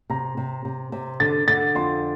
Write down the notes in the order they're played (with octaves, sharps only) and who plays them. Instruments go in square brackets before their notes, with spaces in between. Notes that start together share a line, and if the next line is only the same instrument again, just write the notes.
[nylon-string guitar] C3 [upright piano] A#5
[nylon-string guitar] C3
C3
C3
[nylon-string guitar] D3 [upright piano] A6
[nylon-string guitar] D3 [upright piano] A6
[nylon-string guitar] F2 [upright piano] C6